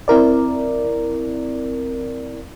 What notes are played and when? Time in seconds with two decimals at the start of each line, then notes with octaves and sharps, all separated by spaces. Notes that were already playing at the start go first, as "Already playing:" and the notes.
0.08 C4 E4 A#4 D5